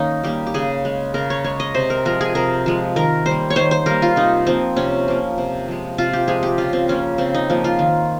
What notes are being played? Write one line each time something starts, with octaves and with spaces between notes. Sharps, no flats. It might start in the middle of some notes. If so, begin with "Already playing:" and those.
Already playing: D#3 A#3 C#4 D#4
G3 A#3 G4
G4
C#3 G#4
G#3
C#3 A#4
C#5
G#3 C#5
D#5
C3 C5
A#4
F3 G#3 A#4
G#4
C3 A#4
F3 G#3
D#3 A#4
G3 C5
A#3
C#5
D#3 C5
C5
G3 A#3 A#4
F4
C3 D#4
F3 A#3 C4
C3 C#4
F3 A#3
C3
F3 G#3
C3 F4
G4
F3 G#3 G#4
G4
C#3 F4
C4
F3 A#3 C#4
C#3 C4
D#4
F3 A#3
F4
D#3